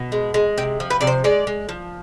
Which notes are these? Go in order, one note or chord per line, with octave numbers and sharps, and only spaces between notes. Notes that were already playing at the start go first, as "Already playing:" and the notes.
Already playing: B2
G#3
G#3
C3 G4
F3
B4
C3 D5
C5
G#3 D5
G#3
F3